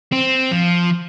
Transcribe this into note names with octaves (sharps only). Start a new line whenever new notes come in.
C4
F3